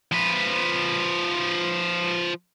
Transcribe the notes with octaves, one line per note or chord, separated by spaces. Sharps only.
F3 B4